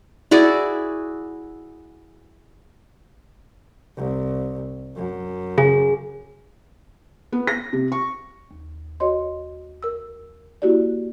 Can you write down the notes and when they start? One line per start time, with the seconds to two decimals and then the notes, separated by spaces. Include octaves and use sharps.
0.31 E4 F#4 G#4 D5
3.96 C2
4.96 F#2
5.58 C#3 G#4
7.33 B3
7.47 A#6
7.73 C3
7.92 C#6
8.51 D#2
9.00 F#4 C#5 D#5 C6
9.83 A#4 E6
10.62 A#3 E4 F#4 G4 D5